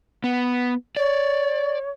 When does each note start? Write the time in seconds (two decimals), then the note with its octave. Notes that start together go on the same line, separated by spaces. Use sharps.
0.24 B3
0.97 C#5 D5